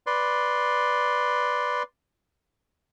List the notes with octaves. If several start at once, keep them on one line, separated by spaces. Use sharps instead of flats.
B4 D5 C6